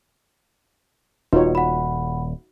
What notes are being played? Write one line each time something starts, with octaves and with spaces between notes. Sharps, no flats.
D#1 D#4 F4 F#4 B4 C#5
F#5 B5